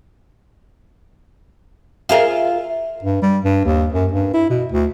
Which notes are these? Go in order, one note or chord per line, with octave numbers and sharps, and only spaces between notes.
F4 G#4 A#4 E5
G2
G3
G2
D#2
F#2
G2
E4
B2
D2